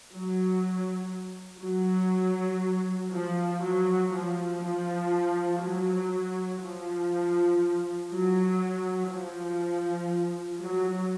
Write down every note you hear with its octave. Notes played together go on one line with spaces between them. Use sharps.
F#3
F#3
F3
F#3
F3
F3
F#3
F3
F#3
F3
F#3